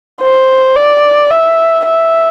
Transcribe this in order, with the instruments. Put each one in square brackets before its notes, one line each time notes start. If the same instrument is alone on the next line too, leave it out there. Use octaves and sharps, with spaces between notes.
[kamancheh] C5
D5
E5
E5